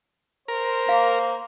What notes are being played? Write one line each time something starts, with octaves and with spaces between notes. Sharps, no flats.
A#4 C5
A#3 F5